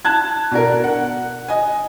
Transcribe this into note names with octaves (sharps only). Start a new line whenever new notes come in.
A5 F#6 G#6
B2 D4 A#4
F#5
D#5 G#5